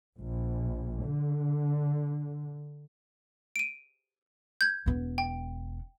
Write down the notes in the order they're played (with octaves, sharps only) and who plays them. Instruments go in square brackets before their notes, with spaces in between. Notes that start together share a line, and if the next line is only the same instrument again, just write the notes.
[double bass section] A#1
D3
[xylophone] D7 D#7
G6 G#6
[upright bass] E1 B3
[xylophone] G5